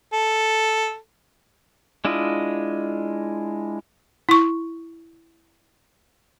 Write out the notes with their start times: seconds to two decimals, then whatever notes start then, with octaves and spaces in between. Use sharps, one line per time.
0.13 A4
2.05 G#3 D4 E4 F4 D#5
4.29 E4 C#6